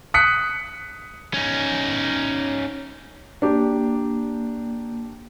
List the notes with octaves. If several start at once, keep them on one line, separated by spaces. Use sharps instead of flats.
D#6 F#6 B6 C#7
C#4 D#4
A#3 D4 G4